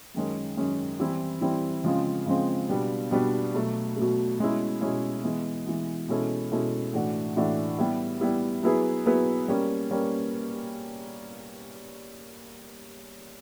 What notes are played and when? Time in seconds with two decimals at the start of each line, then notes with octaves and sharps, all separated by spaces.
0.14 F#2 D#3 G#3 C#4
0.57 F#2 D#3 G#3 C#4
1.00 E3 G3 C4 E4
1.41 E3 G3 C4 E4
1.84 C#3 F3 G#3 C4
2.26 C#3 F3 G#3 C4
2.69 B2 G3 B3 D4
3.11 B2 G3 B3 D4
3.54 B2 F#3 A3
3.97 B2 F#3 A3
4.39 B2 G#3 C#4 E4
4.81 B2 G#3 C#4 E4
5.24 E3 G#3 B3
5.66 E3 G#3 B3
6.08 B2 G#3 C#4 E4 A4
6.51 B2 G#3 C#4 E4 A4
6.93 A2 E3 A3 D4 F#4
7.37 A2 E3 A3 D4 F#4
7.78 G3 B3 E4 G4
8.21 G3 B3 E4 G4
8.63 F#3 B3 E4 G#4 B4
9.06 F#3 B3 E4 G#4 B4
9.48 G3 A#3 C#4
9.91 G3 A#3 C#4